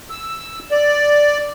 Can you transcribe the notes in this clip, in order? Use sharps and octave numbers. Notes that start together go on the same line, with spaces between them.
E6
D5